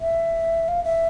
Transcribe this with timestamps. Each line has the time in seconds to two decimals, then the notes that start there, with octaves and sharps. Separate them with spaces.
0.01 E5
0.68 F5
0.84 E5